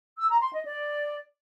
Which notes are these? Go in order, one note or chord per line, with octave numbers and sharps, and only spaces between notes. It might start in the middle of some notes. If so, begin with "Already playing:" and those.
E6
A#5
C6
D#5
D5